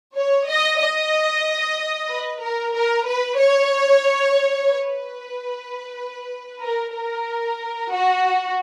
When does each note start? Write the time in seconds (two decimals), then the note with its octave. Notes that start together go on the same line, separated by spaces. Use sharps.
0.16 C#5
0.48 D#5
0.80 D#5
2.10 B4
2.42 A#4
2.74 A#4
3.06 B4
3.39 C#5
4.68 B4
6.62 A#4
6.94 A#4
7.91 F#4